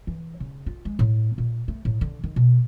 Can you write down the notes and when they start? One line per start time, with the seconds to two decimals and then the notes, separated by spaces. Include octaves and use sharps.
0.07 E3
0.40 C#3
0.66 F4
0.85 G#3
0.99 A2
1.38 A#2
1.68 A3
1.85 A2
2.01 D3
2.24 D#3
2.36 B2